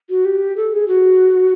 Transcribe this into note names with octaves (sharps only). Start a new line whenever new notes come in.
F#4
G4
A4
G#4
F#4